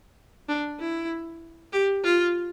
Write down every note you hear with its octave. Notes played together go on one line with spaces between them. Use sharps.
D4
E4
G4
F4